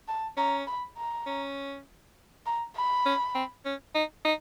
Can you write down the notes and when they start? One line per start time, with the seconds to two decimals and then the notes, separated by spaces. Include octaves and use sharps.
0.08 A5
0.37 C#4 A#5
0.67 B5
0.97 A#5
1.26 C#4
2.46 A#5
2.76 B5
3.06 C#4
3.35 C4
3.66 C#4
3.95 D#4
4.25 D#4